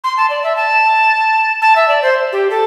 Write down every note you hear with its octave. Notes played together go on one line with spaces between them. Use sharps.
C6
A5
D5
E5
A5
A5
E5
D5
C5
G4
A4